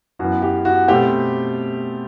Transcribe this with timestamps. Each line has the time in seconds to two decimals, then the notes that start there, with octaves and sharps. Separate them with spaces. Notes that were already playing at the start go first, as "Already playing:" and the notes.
0.19 F#2 E3 B3 F#4
0.42 G4
0.65 F#4
0.88 B2 A3 C4 G4